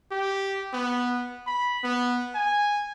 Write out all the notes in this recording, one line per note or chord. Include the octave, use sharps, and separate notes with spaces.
G4
B3
B5
B3
G#5